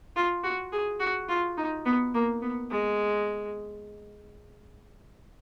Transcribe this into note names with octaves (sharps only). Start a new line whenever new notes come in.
F4
F#4
G#4
F#4
F4
D#4
B3
A#3
B3
G#3